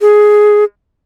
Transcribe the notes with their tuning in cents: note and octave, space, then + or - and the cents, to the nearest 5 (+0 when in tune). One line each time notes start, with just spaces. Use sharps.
G#4 +10